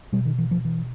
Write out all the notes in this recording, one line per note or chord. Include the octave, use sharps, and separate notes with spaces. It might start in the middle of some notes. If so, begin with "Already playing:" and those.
B2 G3
D#3
E3
F3
E3